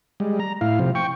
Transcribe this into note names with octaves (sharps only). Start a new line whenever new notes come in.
G3 G#3
A#5
A2 E4 F5
C3 F3
G5 C#6